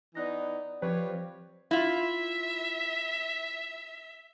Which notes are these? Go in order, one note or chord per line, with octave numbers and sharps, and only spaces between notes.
E3 B3 D#4 D5 F#6 A#6
F3 C4 G4 B4 C#5
E4 F4 E5